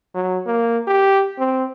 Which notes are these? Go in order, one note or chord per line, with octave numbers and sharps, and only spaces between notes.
F#3
A#3
G4
C4